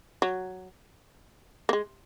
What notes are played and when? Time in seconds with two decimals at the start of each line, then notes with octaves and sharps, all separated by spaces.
0.22 F#3
1.69 A#3
1.73 G#3